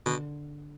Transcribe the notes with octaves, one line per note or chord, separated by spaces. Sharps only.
B2 D3